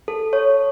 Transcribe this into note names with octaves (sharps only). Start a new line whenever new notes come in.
A4
C#5